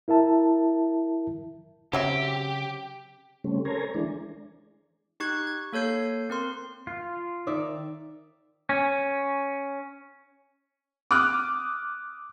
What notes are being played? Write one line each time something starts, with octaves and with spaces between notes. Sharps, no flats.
E4 A#4 E5 A5
C#3 F#3 C4 G4 E5
C#3 G3 A3 C4 C#4
A4 A#4 C5 C#5 G#5 A#5
E3 G#3 D4
D#4 G4 C#6 F#6 G#6
G#6
A#3 A4 C#5 G6 C7
C4 A#4 C6
F4
D#3 D#4 D5 E5
C#4
D6 D#6 F6 F#6